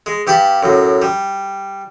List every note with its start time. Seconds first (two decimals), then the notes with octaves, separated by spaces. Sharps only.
0.06 G#3
0.27 G2 G4 G5 A5 B5
0.63 F#2 A2
1.02 G3